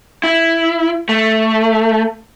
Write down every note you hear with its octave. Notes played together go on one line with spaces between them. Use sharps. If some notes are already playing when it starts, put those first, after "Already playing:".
E4
A3